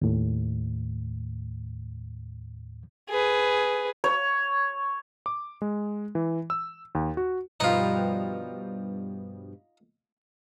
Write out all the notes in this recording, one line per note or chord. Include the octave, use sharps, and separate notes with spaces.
D#2 A2
G#4 B4
C#5
D6
G#3
E3
E6
D#2
F#4
G2 B2 F3 D#4 F4